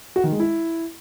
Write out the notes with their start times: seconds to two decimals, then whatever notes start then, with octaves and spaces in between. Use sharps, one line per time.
0.16 F#4
0.24 D#3
0.32 G#3
0.40 E4